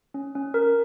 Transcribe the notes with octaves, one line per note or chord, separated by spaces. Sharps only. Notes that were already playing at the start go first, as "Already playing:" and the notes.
C#4
C#4
A#4